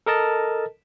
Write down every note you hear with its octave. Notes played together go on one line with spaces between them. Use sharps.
A4 A#4 D#5 A5